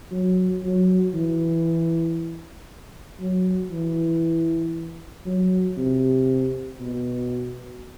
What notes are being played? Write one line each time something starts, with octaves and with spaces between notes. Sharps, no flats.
F#3
F#3
E3
F#3
E3
F#3
C3
B2